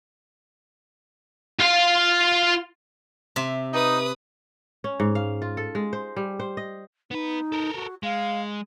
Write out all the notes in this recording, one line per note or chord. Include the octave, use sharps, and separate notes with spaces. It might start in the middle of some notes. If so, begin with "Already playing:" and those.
F4 F5
C3 E5
D#4 B4 D#6
C#4
G#2
F5
F4
A4
G#3
C5
G3
C5
D#5
B3 D#4 B4
A4 A#4
F#4
G#3 F5